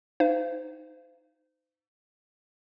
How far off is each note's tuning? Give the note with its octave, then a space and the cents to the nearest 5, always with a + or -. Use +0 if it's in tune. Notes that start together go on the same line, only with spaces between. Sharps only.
D#4 +0 C5 -30 F5 -30